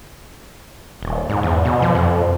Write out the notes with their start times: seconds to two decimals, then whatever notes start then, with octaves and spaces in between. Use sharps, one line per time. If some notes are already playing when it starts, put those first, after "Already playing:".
1.03 D#1
1.29 G#2
1.43 E2
1.65 B2
1.82 F3
1.95 F2